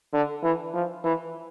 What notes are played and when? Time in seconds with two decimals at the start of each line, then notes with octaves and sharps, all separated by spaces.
0.13 D3
0.43 E3
0.74 F3
1.04 E3